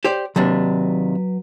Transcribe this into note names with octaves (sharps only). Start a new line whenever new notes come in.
G4 C5 D5
D#2 C3 F#3 D4 B4